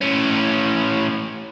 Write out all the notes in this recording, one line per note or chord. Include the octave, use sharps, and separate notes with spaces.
A2 C#4